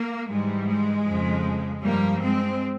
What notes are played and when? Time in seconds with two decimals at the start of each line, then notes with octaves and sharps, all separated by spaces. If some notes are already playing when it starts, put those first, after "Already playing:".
Already playing: A#3
0.27 G#2 E3 G3 G#3
0.66 G#3
1.04 F2 C#3 F3
1.82 G2 F3 G3 A#3
2.21 G#3 C4